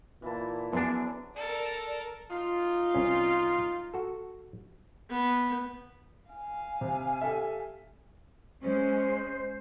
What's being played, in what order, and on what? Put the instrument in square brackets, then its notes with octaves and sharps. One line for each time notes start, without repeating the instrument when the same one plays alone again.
[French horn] A#2 [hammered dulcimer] E3 E4 A5
[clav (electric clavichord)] F#2 D4 [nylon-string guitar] B3 G#4
[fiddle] A4 A#4 [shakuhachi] D5
[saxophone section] F#2 D#4 F4
[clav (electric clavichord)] C2 C#4
F#4 A4
[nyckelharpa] B3
[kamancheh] F5 G#5
[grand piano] C3
G4 A4 E5
[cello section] G#3 C#4 [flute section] C5